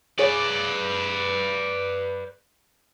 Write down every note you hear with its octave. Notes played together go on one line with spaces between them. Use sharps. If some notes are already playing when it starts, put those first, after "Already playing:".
G#4 B4 C#5 D5